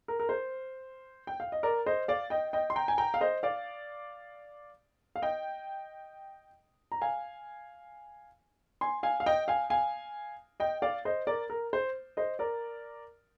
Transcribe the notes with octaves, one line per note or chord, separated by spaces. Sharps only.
A#4
A#4
C5
G5
F5
D#5
A#4 D5
C5 D#5
D5 F5
D#5 G5
D#5 G5
C6
G5 A#5
G#5
G5 A#5
F5
C5 D#5
D5 F5
F5
D#5 G5
A#5
F5 G#5
G#5 C6
F5 G#5
F5
D#5 G5
F5 G#5
F5 G#5
D#5 G5
D5 F5
C5 D#5
A#4 D5
A#4
C5
C5 D#5
A#4 D5